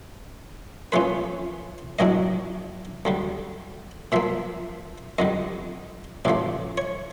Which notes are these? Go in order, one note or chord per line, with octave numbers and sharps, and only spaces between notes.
A#2 F3 A3 C#4 F4 B4
A#1 A2 F#3 A3 D4 D#5
D2 D3 G3
A#2 F3 A#3 E5
F2 D3 G3 D#5
A1 A2 F3 A3 D5
C#5